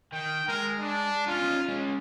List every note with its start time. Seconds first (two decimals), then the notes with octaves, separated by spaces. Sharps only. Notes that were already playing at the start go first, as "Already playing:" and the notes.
0.13 D#3 G5
0.48 G#3 A#4
0.79 D4
1.27 C#4 D#4 F4
1.68 G#3 C#4